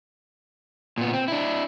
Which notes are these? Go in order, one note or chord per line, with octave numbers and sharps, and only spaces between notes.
A#2 B3
C4
D4 E4